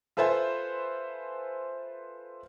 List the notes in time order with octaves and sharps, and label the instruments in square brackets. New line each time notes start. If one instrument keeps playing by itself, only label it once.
[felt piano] F4 A4 B4 C5 E5 G#5